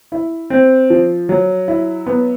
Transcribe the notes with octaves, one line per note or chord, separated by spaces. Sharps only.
E4
C4
F3
F#3
E4
B3